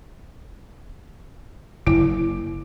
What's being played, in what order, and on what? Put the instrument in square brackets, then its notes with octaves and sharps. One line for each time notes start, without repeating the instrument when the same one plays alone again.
[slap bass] F#1 [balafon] E4